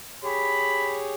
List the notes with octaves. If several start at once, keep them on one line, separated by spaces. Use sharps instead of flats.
G4 G#4 C#5 B5